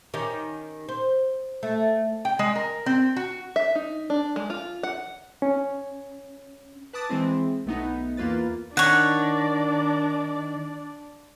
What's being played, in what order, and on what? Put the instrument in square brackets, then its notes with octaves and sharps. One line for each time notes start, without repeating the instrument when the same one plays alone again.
[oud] D#3 C#4 G4
C5
A3
[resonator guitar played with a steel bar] G5
G#3
A#4
C4
F#4
[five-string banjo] E5
D#4
D4
G#3
F4
F#5
[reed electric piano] C#4
[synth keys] B4 A5 D6 D#6 A6
E3 G#3 C4 E4
B1 A3 B3 D#4
E2 A#3 F4 B4 A6
[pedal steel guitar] D#3 [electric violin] D4 D5 [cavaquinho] C#5 F#5